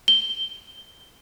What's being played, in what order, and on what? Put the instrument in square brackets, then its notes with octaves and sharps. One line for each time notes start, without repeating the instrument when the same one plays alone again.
[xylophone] G7